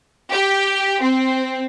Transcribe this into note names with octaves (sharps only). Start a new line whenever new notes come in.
G4
C4